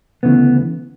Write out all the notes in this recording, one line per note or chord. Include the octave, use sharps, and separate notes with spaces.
D2 C#3 E3 A3 B3